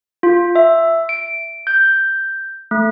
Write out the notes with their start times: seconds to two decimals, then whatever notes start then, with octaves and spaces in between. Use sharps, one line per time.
0.23 F4
0.56 E5
1.09 D7
1.67 G6
2.71 A3